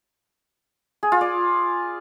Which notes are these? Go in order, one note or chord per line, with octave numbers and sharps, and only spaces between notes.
G#4
F4
D5